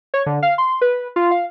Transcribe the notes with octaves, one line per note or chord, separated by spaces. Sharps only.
C#5
D3
F5
C6
B4
F4
F5